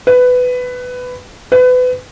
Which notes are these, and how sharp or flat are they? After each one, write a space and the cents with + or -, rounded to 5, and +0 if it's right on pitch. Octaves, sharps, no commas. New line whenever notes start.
B4 +15
B4 +30